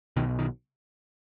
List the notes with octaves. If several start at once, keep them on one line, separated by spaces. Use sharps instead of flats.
B1 B2 D#3
D#3